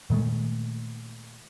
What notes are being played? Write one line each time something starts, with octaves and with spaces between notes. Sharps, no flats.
A#2 D#3 G#3 A3